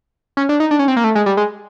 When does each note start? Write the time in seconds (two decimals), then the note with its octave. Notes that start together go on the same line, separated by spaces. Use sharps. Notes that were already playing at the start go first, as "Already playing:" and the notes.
0.37 C#4
0.49 D4
0.60 D#4
0.71 D4
0.79 C#4
0.88 C4
0.97 A#3
1.04 A3
1.15 G#3
1.26 G3
1.37 G#3